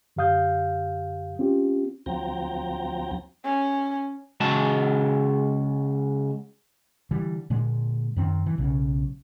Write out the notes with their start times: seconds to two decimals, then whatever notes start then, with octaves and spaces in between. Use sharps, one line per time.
0.16 F#2 D3 G4 F5 D#6 G6
1.39 C4 C#4 F4 G4
2.06 D2 F3 F#3 C4 G5 A#5
3.44 C#4
4.40 C#3 G#3 F#4 A5
7.11 D3 E3 G3
7.50 A#2 D3 G#3
8.16 F#2 D#3 C4
8.46 E3
8.58 B1 C#3